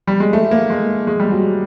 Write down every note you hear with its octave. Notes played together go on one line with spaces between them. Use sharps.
G3
G#3
A3
A#3
G#3
G#3
G3
F#3